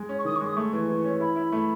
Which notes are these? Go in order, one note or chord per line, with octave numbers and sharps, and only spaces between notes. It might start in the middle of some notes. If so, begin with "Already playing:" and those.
Already playing: G#3
C#4
C#6
D#3 D#6
C#6
G#3
D#6
A3 C#6
E3
E3
C#4
E4 B5
E4
A3